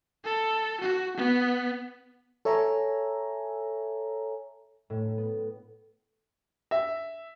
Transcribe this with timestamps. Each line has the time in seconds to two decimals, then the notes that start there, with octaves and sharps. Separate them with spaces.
0.24 A4
0.81 F#4
1.17 B3
2.45 A4 C#5 E5 G#5 A#5
4.90 A2
5.18 B3
6.71 E5